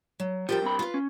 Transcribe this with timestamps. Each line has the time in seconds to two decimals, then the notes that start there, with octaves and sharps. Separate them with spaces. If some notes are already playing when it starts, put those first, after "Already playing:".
0.20 F#3
0.49 F3 G3 G4 A#4 G5
0.62 G2 C3 B5
0.79 F4 B4
0.94 C#4